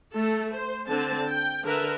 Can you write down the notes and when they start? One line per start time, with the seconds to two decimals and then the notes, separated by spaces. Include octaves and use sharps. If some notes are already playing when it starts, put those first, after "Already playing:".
0.13 A3 A4
0.55 C5
0.88 D3 C4 A5
1.28 G5
1.64 D3 A#4 B4 E5